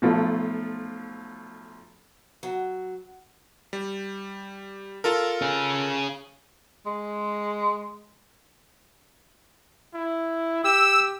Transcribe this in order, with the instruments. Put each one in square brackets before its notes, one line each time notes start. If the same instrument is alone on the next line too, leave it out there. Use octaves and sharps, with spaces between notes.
[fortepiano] B1 F3 A3
[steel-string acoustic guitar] F#3
[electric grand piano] G3
F4 A4 A#4
[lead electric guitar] C#4 G#4
[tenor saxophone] G#3
[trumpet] E4
[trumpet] G4 [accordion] E6